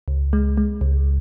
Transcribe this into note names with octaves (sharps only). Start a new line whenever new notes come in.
C#2
G#3
G#3
C#2